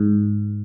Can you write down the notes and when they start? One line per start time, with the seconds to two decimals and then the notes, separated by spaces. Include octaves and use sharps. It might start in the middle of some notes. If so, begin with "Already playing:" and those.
Already playing: G#2